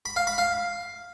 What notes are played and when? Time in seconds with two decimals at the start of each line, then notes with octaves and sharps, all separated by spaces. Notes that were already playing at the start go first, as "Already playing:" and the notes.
0.06 B5
0.16 F5
0.27 B5
0.38 F5